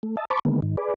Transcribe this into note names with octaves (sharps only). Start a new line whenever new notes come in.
A3
D#5 E5 A5
C5 A5 B5 C#6 D6
D3 D#3 G#3 A#3 B3
G#2 D#3
G#4 B4 D5